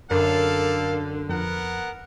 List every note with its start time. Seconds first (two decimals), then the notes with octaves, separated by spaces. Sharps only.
0.11 F#2 D3 A4 A#4 D5 F5
1.29 F2 B3 A#4 F#5